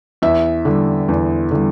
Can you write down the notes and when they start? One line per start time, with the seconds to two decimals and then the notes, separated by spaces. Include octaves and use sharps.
0.22 E2 E5
0.65 D3 G3
1.09 E2
1.51 D3 G3